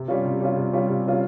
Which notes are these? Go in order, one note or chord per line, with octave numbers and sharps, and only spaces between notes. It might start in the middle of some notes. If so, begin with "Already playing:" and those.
Already playing: C3
G3 C#4 F4
C3
G3 C#4 F4
C3
G3 C#4 F4
C3
G3 C#4 F4